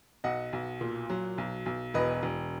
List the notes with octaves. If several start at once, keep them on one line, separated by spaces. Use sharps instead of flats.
B1 D#5 F#5
B1
A#2
F#3
B1
B1
E1 B4 D#5
E1